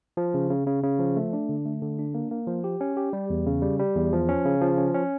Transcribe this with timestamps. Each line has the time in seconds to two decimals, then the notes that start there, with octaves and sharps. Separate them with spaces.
0.17 F3
0.34 C#3
0.50 C#3
0.67 C#3
0.83 C#3
0.99 F3
1.16 A3
1.33 D4
1.49 D3
1.65 A3
1.82 D3
1.99 D4
2.14 A#3
2.31 A#3
2.47 F3
2.64 G4
2.81 C#4
2.97 G4
3.13 G3
3.30 E2
3.46 C#3
3.62 G3
3.79 G3
3.96 E2
4.13 F3
4.29 C#4
4.45 C#3
4.62 F3
4.78 C#4
4.95 C#4